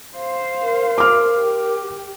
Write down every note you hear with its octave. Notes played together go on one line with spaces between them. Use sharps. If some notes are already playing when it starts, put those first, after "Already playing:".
C5 F5
A#4
D6 F6
G4